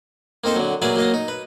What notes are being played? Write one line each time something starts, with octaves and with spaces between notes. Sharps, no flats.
A#3 C4 D#4 A4 C5
D3 F#3
F#3 A#3 G#4 B4 D5 E5
F#3 A#3 D#5 F5
D#4
B4